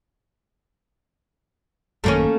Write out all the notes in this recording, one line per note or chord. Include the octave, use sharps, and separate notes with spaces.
A1 F#2 D#3 A3 A#3 C#4